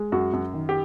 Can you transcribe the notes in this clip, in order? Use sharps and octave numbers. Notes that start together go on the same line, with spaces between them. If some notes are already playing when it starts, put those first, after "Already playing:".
Already playing: G#3
F#2 F#4
F#2
D#3
G4